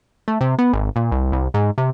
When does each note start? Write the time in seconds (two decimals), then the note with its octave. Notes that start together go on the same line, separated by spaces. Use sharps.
0.28 A3
0.41 C3
0.58 B3
0.73 G#1
0.96 A#2
1.12 C2
1.32 C2
1.54 G#2
1.78 C3